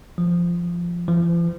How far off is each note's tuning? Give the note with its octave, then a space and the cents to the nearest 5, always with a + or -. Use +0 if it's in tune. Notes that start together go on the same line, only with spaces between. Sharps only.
F3 -10
F3 -45